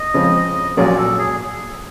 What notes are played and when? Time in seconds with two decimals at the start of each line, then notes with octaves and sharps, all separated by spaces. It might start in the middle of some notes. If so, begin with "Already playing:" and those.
Already playing: D#5
0.14 C#3 F3 G#3 C4
0.77 A#1 A#2 F#3 A#3 C#4 D5
0.98 A4
1.19 G#4